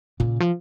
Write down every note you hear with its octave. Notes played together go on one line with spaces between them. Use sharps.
A#2 C#3
F3